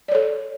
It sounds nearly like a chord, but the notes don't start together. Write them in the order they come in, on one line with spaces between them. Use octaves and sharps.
D5 C#5 A4